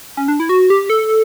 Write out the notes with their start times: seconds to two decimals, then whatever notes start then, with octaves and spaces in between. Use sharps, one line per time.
0.17 C#4
0.28 D4
0.40 E4
0.49 F#4
0.70 G4
0.90 A4